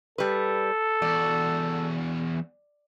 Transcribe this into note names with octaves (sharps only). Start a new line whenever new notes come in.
G3 A4 B4
E2 F#4 D5